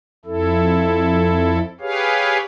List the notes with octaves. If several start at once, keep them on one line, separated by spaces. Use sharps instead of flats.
F2 E4 A4
G4 G#4 B4 C#5 F5